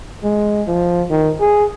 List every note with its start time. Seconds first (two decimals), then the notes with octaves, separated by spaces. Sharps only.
0.24 G#3
0.68 F3
1.11 D#3
1.40 G#4